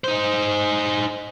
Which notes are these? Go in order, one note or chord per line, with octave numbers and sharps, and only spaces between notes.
D#4 C5